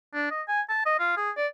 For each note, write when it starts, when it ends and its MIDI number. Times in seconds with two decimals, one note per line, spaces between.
0.14 0.29 62
0.31 0.42 75
0.48 0.61 80
0.69 0.82 81
0.86 0.95 75
0.99 1.17 65
1.17 1.31 68
1.37 1.47 74